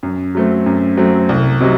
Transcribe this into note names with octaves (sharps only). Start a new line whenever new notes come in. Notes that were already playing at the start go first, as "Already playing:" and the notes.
F#2
F#3 A3 C4
F#2
F#3 A3 C4
C2
C3 F#3 C4 D#4